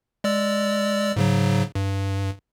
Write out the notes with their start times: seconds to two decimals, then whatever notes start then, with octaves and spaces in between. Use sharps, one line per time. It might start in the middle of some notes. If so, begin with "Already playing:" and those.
0.24 G#3 D5 E6
1.16 G#2 C#3 F#3
1.75 G2